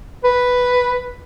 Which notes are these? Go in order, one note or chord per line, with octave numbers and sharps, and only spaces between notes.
B4